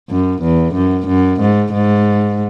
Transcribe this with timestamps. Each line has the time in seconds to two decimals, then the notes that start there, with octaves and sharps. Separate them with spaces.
0.10 F#2
0.42 E2
0.75 F#2
1.08 F#2
1.41 G#2
1.73 G#2